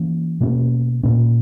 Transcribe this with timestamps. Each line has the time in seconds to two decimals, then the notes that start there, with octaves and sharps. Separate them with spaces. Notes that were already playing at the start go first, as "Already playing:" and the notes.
Already playing: E3 A#3 C#4
0.41 B2 A#3 C#4
1.03 A#2 A#3 C#4